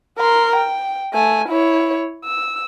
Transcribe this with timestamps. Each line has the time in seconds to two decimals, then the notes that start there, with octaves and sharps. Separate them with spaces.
0.18 A#4 C6
0.56 G5
1.13 A3 G#5
1.49 E4 C#5
2.25 E6